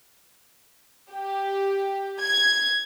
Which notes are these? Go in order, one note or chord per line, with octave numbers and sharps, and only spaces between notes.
G4
G#6